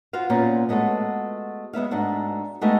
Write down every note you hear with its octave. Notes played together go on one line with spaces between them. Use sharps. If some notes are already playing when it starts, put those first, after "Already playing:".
F4 F#4 C5 F5
A#2 B3 C#4 C5 D5
G#3 A3 B3 F#4 A4
G#3 B3 E5 F5
G#2 A3 D4 F#4
G#3 A3 B3 D#4 G4